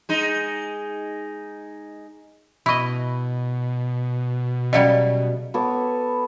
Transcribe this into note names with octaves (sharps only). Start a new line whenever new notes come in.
G#3 D#4
B2 E4 D#5 B5 C#6
C#3 F#3 G3 D5 D#5
B3 A4 C#5 D6